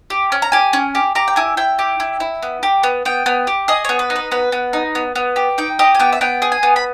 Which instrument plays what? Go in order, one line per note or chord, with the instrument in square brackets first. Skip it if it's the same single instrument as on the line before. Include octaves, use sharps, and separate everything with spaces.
[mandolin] G4
C#4
A#5
G4 G#5
C#4
G4
G4 A#5
G5
E4 G#5
E4 G5
G4
E4
E4
B3
G4
B3
B3 G5
B3
G4
G#4 D#5
B3 C#5
B4
D#4
B4
B3 B4
B3
D#4
B3
B3
G4
D#4 G5
G4 D#5
G#5
B3 G5
E5
B3 G5
G#4
G#5
B3
B5